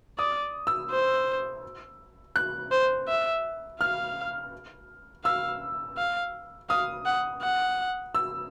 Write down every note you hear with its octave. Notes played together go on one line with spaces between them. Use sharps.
D5 D#6
E6
C5
F#6
C5
E5
F5 F6
F5 E6
F5
F5 D#6
F#5
F#5
E6